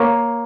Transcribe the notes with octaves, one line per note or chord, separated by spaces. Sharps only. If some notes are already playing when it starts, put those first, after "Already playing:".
Already playing: A#3 C#5